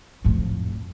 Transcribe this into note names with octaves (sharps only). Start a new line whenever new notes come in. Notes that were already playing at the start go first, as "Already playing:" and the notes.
F2 A2